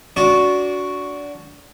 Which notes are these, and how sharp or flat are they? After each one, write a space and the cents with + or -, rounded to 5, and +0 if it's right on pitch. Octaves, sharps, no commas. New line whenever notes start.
D4 -20 F#4 +0 D5 -25